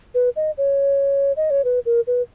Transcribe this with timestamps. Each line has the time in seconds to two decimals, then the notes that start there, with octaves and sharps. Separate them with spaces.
0.15 B4
0.36 D#5
0.58 C#5
1.37 D#5
1.50 C#5
1.64 B4
1.86 A#4
2.07 B4